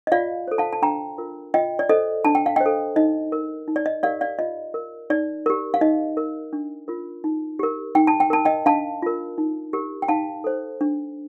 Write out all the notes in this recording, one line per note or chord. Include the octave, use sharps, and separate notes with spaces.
D#5
F4 D5 F5
A4 C5
F5 A5
A5
D4 G5 A#5
F4 A#4
F4 D#5 G5
D5
A4 C5 D#5
D4 A5
G5
F5
C5 D#5 G5
A4
D#4 D#5
A#4
D#4
D5
D#5
G4 A#4 D5 F5
D5 F5
F4 D#5
A#4
D#4 D5
G4 A#4
F5
D#4 D#5
A#4
D4
F4 A#4
D#4
G4 A#4
D#4 G5
A5
G5
A#4 A5
D#5 G5
D4 F5 A5
F4 A#4
D#4
G4 A#4
G5
D#4 F5 A5
A4 C5
D4